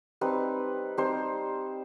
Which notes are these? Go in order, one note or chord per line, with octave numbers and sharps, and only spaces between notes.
G3 C4 D#4 B4
G3 C4 D#4 C5